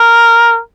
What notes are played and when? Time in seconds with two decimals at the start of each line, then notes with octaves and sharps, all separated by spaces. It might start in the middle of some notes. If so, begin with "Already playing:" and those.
Already playing: A#4